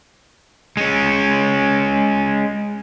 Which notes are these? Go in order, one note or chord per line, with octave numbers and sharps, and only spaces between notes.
G#3 C#4